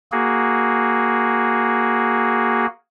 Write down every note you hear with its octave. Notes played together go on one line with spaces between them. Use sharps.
A#3 F#4 G#4